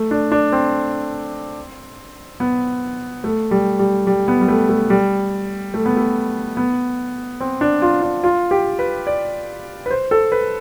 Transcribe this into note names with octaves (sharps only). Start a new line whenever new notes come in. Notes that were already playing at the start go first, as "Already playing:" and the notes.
Already playing: A3
D4
D4
C4
B3
A3
G3
G3
G3
B3
G3
A3
A3
G3
A3
B3
A3
B3
C4
D4
F4
D4
F4
G4
B4
D5
B4
C5
A4
B4